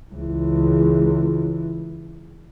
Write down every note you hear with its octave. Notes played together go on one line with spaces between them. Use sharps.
C#2 E3